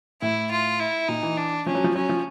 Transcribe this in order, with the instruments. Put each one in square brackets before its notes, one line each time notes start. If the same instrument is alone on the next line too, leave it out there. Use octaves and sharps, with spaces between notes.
[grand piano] A2 [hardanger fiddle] E4
[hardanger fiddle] F4
E4
[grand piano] A#2 [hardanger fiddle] D#4
[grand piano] E3
[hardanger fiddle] D4
[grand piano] F3 [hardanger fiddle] C#4
[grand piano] F#3
F3
[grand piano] F#3 [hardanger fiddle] C#4
[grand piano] F3